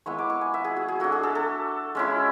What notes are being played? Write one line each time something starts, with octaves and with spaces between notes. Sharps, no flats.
G#3 B3 E4 C#6
D6
C#6
G#5
E5
G#4
F#4
G#4
A3 D4 F#4
G#4
A4
A4
G#3 C#4 E4